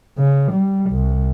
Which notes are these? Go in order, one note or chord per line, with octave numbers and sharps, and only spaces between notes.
C#3
G3
C2